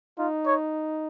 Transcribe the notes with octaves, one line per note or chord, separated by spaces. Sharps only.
D#4 F4
C#5